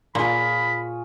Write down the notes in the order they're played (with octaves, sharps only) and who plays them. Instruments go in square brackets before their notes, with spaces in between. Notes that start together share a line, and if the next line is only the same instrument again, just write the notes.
[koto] A#2 [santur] F4 G#4 C#5 [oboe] B5